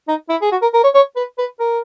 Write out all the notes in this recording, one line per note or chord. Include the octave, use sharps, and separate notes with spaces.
D#4
E4
G#4
F#4
A#4
A#4
C#5
C#5
B4
B4
A#4